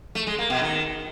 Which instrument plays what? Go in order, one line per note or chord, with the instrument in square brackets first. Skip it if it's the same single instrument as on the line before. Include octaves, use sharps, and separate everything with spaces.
[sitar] A3
G#3
A#3
B2
D#3